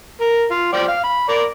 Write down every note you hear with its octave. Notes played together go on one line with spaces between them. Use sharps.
A#4
F4
F3 D5 G5
F5
B5
A#4 D5